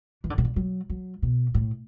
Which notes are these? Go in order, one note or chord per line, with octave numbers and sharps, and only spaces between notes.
E3
D3
C3
D3
F#3
F#3
B2
A2